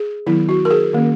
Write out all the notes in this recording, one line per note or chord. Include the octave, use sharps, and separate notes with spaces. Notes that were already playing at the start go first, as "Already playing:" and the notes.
Already playing: G#4
D#3 F#3 B3 E4
F#4
A#4
G#4
D#3 A#3 C#4